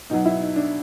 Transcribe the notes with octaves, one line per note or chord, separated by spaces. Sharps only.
B2 F#3 D#4
E4
D#4
D4